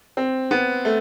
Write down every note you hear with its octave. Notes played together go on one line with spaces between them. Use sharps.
C4
B3
A3